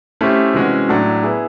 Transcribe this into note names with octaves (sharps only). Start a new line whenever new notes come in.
A3 C#4 E4 G4 C5
C3 E3 G#3 C#4 F#4
A2 F#3 A3 D4
B3 E4 G#4